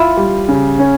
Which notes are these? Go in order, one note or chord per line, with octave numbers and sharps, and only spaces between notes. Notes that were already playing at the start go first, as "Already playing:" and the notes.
Already playing: E4 F4
G3
C#3
C#4